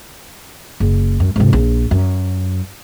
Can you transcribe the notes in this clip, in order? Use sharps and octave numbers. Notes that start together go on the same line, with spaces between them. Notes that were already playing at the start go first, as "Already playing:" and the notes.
F#1
F#2
G#2 C3
A#1
F#2